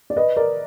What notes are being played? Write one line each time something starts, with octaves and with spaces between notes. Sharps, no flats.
D5
B4 D#5
A#4 D5